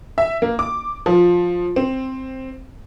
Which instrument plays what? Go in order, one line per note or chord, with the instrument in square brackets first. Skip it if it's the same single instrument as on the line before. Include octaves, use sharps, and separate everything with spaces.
[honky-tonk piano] E5
A#3
D6
F3
C4